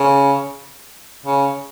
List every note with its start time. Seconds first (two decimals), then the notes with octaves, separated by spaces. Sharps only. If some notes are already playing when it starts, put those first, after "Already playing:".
Already playing: C#3
1.26 C#3